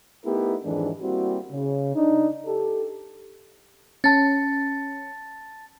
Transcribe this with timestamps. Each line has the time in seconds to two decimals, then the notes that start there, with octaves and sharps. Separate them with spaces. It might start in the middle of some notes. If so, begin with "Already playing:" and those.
0.25 A3 B3 D#4 E4 G4 A#4
0.65 F2 G#2 D#3 E3 G#3 D4
1.01 G3 A#3 C4 E4 F#4
1.51 C#3
1.96 D4 D#4
2.47 G4 A4
4.04 C#4 A5 A6